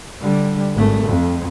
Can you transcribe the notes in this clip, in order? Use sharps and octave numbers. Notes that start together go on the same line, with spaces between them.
D3 G3
G#1 A3
F2